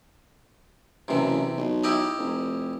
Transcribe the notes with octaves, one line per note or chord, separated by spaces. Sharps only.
F#1 C3 E3
B1
E4 G4 D#5
F1